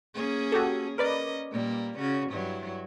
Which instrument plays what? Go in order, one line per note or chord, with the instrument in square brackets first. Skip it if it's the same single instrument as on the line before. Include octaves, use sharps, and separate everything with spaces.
[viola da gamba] A#3 C#4 G#4
[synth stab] F#4 G4 A4
[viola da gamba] C#4 D#5 [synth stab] A#4 B4 D5
[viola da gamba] A#2 G3 A#3
C#3 C#4 F#4
G2 F#3 E4